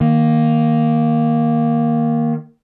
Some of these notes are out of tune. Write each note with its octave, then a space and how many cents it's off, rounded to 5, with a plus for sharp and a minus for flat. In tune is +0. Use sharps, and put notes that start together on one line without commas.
D#3 +0 A#3 +0